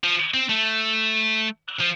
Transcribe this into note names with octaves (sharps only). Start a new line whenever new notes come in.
F3
C4
A3
F3